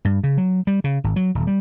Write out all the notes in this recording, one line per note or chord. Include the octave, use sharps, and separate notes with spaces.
G2
C#3
F#3
G3
C#3
G#1
F#3
D#1
G3